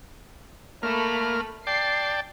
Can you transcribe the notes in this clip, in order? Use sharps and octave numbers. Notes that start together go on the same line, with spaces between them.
A3 A#3 B5 F6
D5 G5 A5 C7